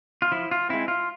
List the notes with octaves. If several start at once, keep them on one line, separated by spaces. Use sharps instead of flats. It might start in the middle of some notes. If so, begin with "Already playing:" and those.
F4
F3 E4
F4
G#3 C4 E4
F4